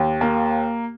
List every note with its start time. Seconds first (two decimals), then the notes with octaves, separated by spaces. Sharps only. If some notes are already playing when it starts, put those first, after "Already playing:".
Already playing: D#2
0.21 A#3